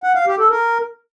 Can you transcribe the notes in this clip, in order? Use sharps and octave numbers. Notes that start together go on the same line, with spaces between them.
F#5
F5
G4
A4
A#4